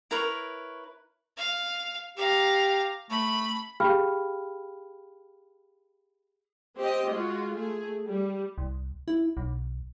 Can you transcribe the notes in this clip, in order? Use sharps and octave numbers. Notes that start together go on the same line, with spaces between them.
E4 A#4 B4 C#5
F5
G4 F5 A#5
A3 B5
G4 G#4 F5 G5 B5 F6
C4 G4 D#5
G#3 F4 F#4
A3 G#4
G3
C2
E4
B1